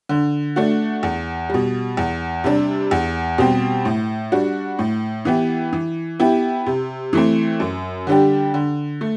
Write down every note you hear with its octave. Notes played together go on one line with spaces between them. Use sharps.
D3
A3 D4 F#4
E2
B2 G3
E2
C3 G3 D4
E2
B2 G3 C4 G4
A2
G3 D4 F#4
A2
E3 B3 E4 G4
E3
B3 E4 G4
C3
E3 A3 C4
F#2
D3 G3 D4 G4
D3
A3